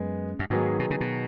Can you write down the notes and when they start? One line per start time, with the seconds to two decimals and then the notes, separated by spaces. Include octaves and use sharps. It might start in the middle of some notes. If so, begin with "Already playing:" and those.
Already playing: F#2 G#3 B3 G#4
0.39 F#2
0.50 G#2 D#3 F#3 B3 G#4
0.79 B2
0.90 C#3
1.01 B2